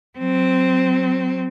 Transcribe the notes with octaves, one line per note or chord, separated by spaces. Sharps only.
F#3 C4